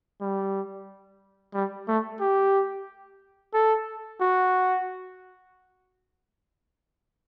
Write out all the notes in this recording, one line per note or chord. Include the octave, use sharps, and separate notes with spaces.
G3
G3
A3
G4
A4
F#4